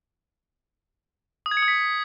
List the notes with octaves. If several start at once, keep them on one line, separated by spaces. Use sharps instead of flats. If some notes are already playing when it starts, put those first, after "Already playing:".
D#6
G#6
C#7
D#6
B6